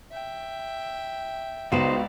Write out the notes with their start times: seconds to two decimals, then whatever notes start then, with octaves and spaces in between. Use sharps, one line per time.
0.12 E5 G5
1.72 C#2 B3 D#4 F#4 C5 D5 A#5 E7